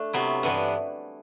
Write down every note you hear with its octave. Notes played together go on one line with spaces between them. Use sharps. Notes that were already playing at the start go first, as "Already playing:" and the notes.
Already playing: A3 D4
C3 F#3 B3 E4
G2 E3 B3 D4